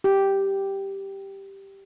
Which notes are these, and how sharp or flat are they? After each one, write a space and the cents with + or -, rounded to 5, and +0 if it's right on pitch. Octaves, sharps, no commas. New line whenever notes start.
G4 +0